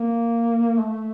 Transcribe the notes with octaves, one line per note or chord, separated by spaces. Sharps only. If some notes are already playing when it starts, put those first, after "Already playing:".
Already playing: A#3
A3